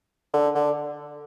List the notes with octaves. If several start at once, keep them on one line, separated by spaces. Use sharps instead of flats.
D3
D3